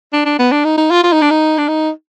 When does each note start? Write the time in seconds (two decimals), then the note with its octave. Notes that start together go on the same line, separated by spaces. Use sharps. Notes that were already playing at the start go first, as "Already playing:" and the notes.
0.13 D4
0.26 D4
0.39 B3
0.52 D4
0.65 D#4
0.78 D#4
0.91 F4
1.04 F4
1.13 D#4
1.22 D4
1.31 D#4
1.58 D4
1.68 D#4